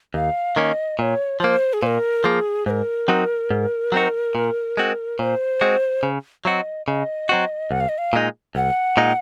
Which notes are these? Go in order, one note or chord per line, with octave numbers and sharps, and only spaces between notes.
D#2 F5
D#3 A#3 C#4 D#5
A#2 C#5 D#5
F3 A#3 C5
G#4
A#2 A#4 C5
F3 A#3 G#4
G#2 A#4 C5
F#3 C4 D#4 F#4
G#2
F#3 C4 D#4 F#4
A#2
G#3 C4 F#4
A#2 C5 C#5
G#3 C4 F#4
C#3
F#3 C4 F#4 D#5 F5
C#3 D#5
F#3 C4 F#4
C2 F#5
F5
D#5
F5
A#2 G#3 D#4
C2 F#5
A#2 G#3 D#4